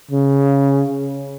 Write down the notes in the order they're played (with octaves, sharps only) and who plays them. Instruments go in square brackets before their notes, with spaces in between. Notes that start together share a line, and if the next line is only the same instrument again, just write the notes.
[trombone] C#3